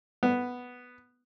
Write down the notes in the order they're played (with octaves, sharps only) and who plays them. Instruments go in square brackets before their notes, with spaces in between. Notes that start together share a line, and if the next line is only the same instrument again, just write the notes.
[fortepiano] B3